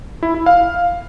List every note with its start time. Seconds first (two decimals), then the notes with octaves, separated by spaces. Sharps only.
0.23 E4
0.34 E4
0.46 F5